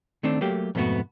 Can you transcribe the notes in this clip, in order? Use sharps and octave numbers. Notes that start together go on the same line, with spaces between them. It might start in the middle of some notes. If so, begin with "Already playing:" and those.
D#3 A3 C4 D4
F#3 A3 A#3 G4
F2 G#2 B2 A3 B3 F#4